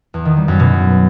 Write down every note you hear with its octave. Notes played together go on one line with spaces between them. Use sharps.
E2
D#3
G3
F#2
B2